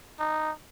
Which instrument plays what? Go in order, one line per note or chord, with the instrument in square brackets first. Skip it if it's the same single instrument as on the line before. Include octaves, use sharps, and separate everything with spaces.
[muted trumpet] D#4